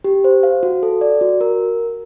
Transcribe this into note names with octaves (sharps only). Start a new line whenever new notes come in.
G4
C5
F5
F#4
A4
D5
F#4
A#4